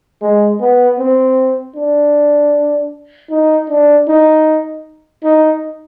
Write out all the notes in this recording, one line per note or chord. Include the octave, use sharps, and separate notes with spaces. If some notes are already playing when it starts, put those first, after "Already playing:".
G#3
B3
C4
D4
D#4
D4
D#4
D#4